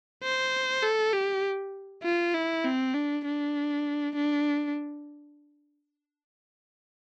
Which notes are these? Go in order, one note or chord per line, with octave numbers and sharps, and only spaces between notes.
C5
A4
G4
F4
E4
C4
D4
D4
D4